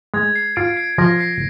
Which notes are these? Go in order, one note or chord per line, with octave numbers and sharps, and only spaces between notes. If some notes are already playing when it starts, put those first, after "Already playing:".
G#3 G#6
C7
F4 D7
C7
F3 A#6
C7